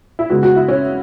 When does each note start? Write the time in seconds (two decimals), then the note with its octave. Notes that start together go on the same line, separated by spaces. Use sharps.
0.19 E4
0.30 C#3 G#3 B3 F#4
0.43 F#4
0.56 E4
0.68 C#4